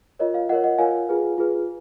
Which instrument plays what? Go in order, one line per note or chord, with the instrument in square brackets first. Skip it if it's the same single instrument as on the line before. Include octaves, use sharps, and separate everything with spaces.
[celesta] F4 A#4 C#5 D#5
F5
F4 A#4 C#5 D#5 F#5
D#5 F#5
F4 A#4 C#5 F5 G#5
F4 G#4 B4
F4 G#4 B4